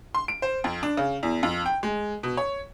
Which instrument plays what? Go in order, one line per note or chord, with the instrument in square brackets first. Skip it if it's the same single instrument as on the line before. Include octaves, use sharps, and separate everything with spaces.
[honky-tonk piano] C6
D7
C5
F2
D4
C#3
E2
F2
G5
G#3
B2
C#5